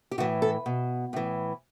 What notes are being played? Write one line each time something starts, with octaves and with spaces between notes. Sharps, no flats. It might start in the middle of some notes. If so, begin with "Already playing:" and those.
G4
A2 E3 F#4
A4
B2
A2 E3